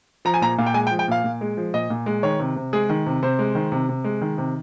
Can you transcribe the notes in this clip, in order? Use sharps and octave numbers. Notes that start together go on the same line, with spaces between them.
F3 A#5
G#5
A#2 A#5
A#2 F5
G5
G#3 G#5
G5
F3
G5
A#2 F5
A#2
G#3
F3
A#2 D#5
A#2
G#3
D#3 C#5
C3
C3
G#3 G#4
D#3
C3
C3 C5
G#3
D#3
C3
C3
G#3
D#3
C3